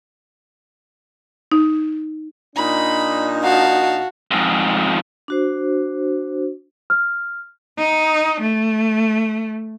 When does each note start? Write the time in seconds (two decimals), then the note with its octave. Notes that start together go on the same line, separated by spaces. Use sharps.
1.52 D#4
2.56 A#2 D4 D#4 B5
3.44 F#4 F5 A5
4.31 F2 G#2
5.28 D4 F#4 C5
6.90 F6
7.79 D#4
8.41 A3